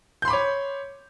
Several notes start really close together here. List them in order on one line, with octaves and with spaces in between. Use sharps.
G6 C6 B5 D6 C#5